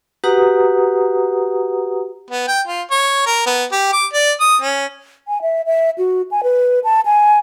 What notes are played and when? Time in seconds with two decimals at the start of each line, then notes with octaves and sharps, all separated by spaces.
0.24 F#4 G4 B4 F#5 A#5 D#6
2.30 B3
2.47 G5
2.67 F4
2.91 C#5
3.26 A#4
3.46 B3
3.72 G4
3.93 D6
4.13 D5
4.40 D#6
4.61 C#4
5.28 G#5
5.42 E5
5.66 E5
5.98 F#4
6.31 G#5
6.43 B4
6.84 A5
7.06 G#5